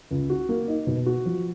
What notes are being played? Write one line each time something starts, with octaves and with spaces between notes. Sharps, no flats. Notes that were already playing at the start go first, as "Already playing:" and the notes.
C#2
F#4
A#3
D#4
B2
F#4
F3